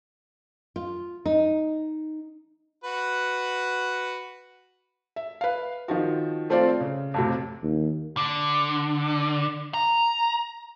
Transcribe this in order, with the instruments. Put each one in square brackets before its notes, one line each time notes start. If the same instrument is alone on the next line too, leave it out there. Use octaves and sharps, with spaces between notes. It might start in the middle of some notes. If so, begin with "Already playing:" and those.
[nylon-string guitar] F4
D#4
[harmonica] F#4 B4
[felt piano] E5
B4 F5
D#3 F3 F#4
A3 C4 F4 C5 D5
C#3
F2 A2 C3
[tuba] D#2
[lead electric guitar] D3
A#5